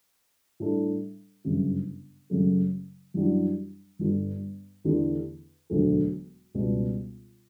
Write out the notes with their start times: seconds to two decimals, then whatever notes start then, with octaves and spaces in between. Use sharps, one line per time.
0.60 A2 G3 D4 A4
1.45 G1 F#2 C#3
2.30 F#2 C#3 F#3 A3
3.14 F#2 E3 G3 D4 F#4
3.99 G1 G2 D3 G3
4.84 E2 D3 A3 E4 G4
5.70 E1 D2 D3 F#3 A3
6.55 C#2 B2 G3